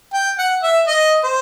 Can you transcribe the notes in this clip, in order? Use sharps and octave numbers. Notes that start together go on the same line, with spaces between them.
G5
F#5
E5
D#5
C5